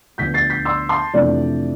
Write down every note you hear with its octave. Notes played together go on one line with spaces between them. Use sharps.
D2 D3 F3 B3 G6 B6
A6 C7
G6 B6
C6 E6
A5 C6
F2 C3 E3 A3 D4 D5